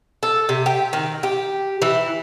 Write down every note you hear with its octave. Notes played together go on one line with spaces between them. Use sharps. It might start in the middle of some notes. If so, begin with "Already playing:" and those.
A4
C3
G4
D#3
G4
E3